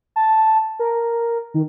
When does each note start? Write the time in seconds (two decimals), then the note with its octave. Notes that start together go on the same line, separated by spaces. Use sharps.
0.16 A5
0.79 A#4
1.54 D#3